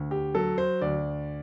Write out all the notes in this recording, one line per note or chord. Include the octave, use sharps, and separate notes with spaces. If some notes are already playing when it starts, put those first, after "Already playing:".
Already playing: D2
G4
F#3 A4
C5
D2 D5